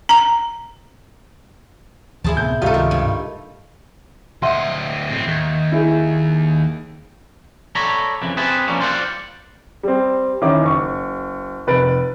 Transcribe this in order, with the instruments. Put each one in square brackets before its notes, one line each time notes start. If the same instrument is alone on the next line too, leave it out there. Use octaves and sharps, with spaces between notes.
[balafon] A#5
[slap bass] D2 D#3 F3 [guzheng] E4 G#4 A5
[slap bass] A2 C3 B3 [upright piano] G6
[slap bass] C#2 G#2 C3 [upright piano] G3 A3 F4 [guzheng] D#4 A4
[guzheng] D#3
G2
[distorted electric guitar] D2 D#5 [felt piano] E5 F#5 C6
[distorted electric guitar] A2 C4
D#2
[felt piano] E4 G#4
[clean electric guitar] A4 C#5 D5 A#5 B5
F2 C#3 E3
C4 G4 G#4 B4 A5
F3 G3 A#3 C#4 D4
G3 F4 C5 D5 D#5 F#5
[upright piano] G3 C4
D#3 C#4 E4 D6
F#1 C#6
F1 B4 A6 D7